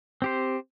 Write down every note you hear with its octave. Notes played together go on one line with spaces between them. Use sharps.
C4 G4 C5